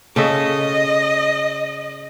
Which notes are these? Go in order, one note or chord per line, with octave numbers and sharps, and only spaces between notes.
C#3 A4 D#5 E5